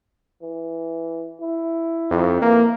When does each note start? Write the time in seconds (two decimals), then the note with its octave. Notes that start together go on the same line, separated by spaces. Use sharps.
0.42 E3
1.41 E4
2.11 F2
2.42 E3 A#3